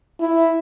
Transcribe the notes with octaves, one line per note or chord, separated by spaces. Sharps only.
E4